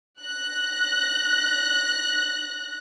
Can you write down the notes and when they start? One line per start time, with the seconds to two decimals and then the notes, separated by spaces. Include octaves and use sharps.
0.21 F#6 A#6